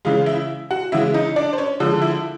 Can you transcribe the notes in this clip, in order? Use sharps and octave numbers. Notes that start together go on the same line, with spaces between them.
C#3 E3 G#3 F4 F5
E4 E5
F#4 F#5
C#3 E3 G#3 E4 E5
D#4 D#5
D4 D5
C5
C#4 C#5
D3 F3 G#3
E4 E5